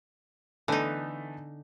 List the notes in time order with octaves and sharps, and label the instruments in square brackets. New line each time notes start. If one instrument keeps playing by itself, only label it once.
[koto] D3 D#4 [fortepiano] E3 A3 B3